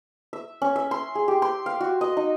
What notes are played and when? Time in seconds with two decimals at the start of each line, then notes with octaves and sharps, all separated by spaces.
0.33 E5
0.62 C#4
0.76 E5
0.91 C6
1.15 G#4
1.28 G4
1.42 C6
1.66 F5
1.81 F#4
2.01 D#5
2.17 D#4